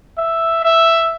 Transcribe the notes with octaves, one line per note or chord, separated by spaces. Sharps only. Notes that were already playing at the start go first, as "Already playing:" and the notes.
E5
E5